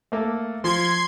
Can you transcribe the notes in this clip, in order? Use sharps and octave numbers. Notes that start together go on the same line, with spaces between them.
A3 A#3 A4
F3 C6 G#6